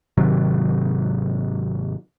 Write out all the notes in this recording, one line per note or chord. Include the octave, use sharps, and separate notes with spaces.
G#1 C3 D#3 F#3